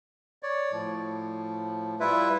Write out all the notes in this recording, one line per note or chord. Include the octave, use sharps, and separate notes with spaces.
C#5 D5
A2 F3
G3 E4 F4 B4 E5